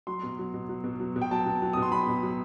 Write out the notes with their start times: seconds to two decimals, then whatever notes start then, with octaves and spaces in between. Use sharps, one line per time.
0.07 F#3 C6
0.23 B2
0.39 F#3
0.54 B2
0.69 F#3
0.84 B2
1.00 F#3
1.16 B2
1.21 G5
1.31 F#3 A5
1.46 B2
1.62 F#3
1.73 B2 D#6
1.82 C6
1.92 F#3 B5
2.08 B2
2.23 F#3